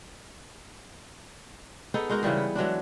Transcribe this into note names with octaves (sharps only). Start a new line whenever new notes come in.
B3 D#4 G#4 A4
G#3 D#4 F#4 A#4
C#3 E3 G3 G#4
B3
E3 F#3 G#3 D4